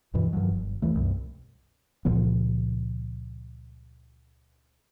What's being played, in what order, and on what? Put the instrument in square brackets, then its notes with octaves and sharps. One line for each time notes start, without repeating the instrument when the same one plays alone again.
[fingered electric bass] D2 G2 B2 E3
G2 D#3 F3 F#3
G1
D#2 E3 A3
C2 F#2 B2
C#2 A#2 F3 B3